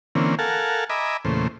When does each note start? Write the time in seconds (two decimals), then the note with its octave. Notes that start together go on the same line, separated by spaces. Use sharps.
0.15 D3 E3 A#3 C4 C#4
0.39 A4 A#4 F5 F#5 G#5 A5
0.90 D#5 E5 G#5 A#5 B5 D6
1.25 E2 A#2 C#3 A3 C5